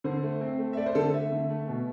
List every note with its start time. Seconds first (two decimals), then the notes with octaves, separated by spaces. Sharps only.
0.04 D3 C5
0.23 A3
0.41 C4
0.59 A3
0.73 E5
0.77 A3 D5
0.86 C5
0.95 D3 A4
1.13 A3 E5
1.31 D3
1.50 A3
1.68 B2